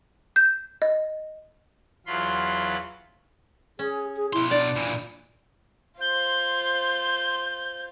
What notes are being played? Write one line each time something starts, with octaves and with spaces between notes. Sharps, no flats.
G6
D#5
E2 F#3 F4 B5 C6
C#4 G#4
G#4
B2 E4 C6
D4 D5
A#2 E3
F4 C5 G6